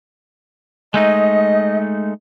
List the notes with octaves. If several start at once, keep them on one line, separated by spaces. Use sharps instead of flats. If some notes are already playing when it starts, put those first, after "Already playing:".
G#3 A3 D#4 D#5